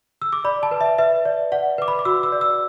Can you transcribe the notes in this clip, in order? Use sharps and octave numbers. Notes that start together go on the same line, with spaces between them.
E6
D6
D5 B5
A5
B4
E5
B4 E5
D5
D5 F#5
B4 D6
B5
D6
F#4 E6
E6
D5
E6